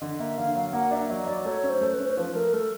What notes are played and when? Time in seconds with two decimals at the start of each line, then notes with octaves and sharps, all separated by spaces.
0.01 D3 D#5
0.19 A#3 E5
0.37 D3 F5
0.55 F#3 F5
0.73 A#3 F#5
0.91 D4 E5
1.10 F#3 D#5
1.27 F#3 D5
1.45 A3 C#5
1.63 C#4
1.69 C5
1.81 A3
1.93 B4
2.00 C#4
2.07 C5
2.17 F3 B4
2.34 A3 A#4
2.53 A3 A4